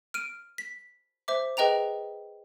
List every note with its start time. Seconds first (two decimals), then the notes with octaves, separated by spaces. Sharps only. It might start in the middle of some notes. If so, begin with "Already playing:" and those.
0.14 F6 D7 D#7
0.58 B6
1.28 C5 E5 D6
1.57 G#4 B4 D#5 G5 A#5 F7